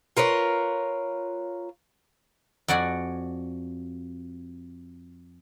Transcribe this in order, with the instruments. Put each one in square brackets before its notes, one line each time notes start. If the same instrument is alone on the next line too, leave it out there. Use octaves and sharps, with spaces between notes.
[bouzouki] F4 A#4 B4 C#5
[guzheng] F2 F#4 D5 F#5 G#5